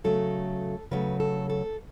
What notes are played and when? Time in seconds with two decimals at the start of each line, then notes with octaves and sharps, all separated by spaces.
0.04 C#3 F#3 A3 A4
0.91 C#3 F#3 A3 B4
1.20 A4
1.50 A4